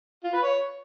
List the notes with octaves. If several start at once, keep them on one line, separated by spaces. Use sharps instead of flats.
F4
B4
C#5